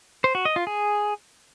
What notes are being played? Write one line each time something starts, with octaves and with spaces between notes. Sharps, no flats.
C5
F#4
D#5
F4
G#4